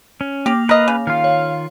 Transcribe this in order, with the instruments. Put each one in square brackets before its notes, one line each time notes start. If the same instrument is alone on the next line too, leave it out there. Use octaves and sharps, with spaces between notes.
[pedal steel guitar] C#4
[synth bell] A#3 D6 F7 [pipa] G4
[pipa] A#4 D#5 [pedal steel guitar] B4 F5
[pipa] C#3
[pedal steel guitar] D#3 F4 [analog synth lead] F5
[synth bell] C#5